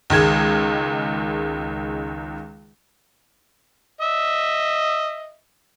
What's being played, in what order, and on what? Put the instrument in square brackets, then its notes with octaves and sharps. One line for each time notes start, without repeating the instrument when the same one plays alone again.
[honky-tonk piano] C#2 D#3 G#3 G#6 E7
[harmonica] D#5 E5